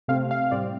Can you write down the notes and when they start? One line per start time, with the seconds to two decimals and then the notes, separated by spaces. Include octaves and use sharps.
0.08 C3 A3 C4 F5
0.31 F5
0.51 A2 G3 C4 D5